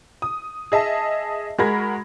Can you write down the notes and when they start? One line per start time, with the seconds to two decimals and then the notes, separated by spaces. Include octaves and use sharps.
0.22 D#6
0.72 G#4 D#5 E5 A5
1.58 G#3 F#4 A#4 B5 G#6 A#6